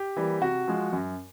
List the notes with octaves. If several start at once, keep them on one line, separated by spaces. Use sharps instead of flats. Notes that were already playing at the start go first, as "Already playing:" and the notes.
Already playing: G4
E3 G3 A#3
C3 F#4
F3 G#3
F#2